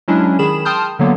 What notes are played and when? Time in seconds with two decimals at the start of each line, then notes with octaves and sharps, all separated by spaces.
0.08 F#3 G#3 C#4 D4 E4
0.39 D#3 G#4 B5 E7
0.65 G5 A5 C6 D#6 F6 G6
0.99 D3 F#3 A#3 B3